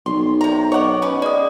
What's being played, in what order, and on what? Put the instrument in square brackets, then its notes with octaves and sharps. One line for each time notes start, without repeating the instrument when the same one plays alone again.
[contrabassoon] B1 [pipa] C6
[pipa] C3 A#5
[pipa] C#5 F#5 [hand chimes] D#5 D6
[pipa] C#4 B4
[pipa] G#3 [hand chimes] D5 D#6